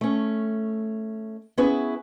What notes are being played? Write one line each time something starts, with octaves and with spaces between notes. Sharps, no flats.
A3 C#4
B3 C#4 E4 G#4 B4